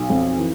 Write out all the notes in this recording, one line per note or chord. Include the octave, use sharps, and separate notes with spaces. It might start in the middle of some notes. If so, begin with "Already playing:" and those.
Already playing: B1
F2
E3